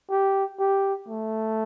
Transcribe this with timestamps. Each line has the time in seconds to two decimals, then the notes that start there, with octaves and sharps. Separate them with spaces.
0.10 G4
0.60 G4
1.08 A3